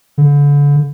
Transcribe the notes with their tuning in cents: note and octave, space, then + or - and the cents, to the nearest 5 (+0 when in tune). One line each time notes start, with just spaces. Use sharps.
D3 -35